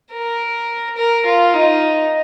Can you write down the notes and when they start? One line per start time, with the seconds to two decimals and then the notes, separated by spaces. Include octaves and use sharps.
0.12 A#4
0.97 A#4
1.26 F4
1.53 D#4